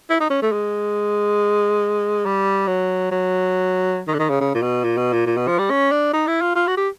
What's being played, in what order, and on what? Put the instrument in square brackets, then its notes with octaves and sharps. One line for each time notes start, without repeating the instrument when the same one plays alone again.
[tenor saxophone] E4
D#4
C#4
A3
G#3
G3
F#3
F#3
D#3
D3
D#3
C#3
C#3
A#2
B2
A#2
B2
A#2
A#2
B2
F3
G3
C#4
D4
D#4
E4
F4
F4
F#4
G4